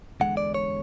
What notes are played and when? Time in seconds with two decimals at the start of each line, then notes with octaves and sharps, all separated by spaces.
0.20 E2 D3 G#3 F#5
0.37 D5
0.54 C#5